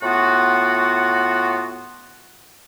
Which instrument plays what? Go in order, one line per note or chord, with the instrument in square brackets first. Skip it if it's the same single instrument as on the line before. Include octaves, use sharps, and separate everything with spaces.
[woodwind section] A2 B3 F4 F#4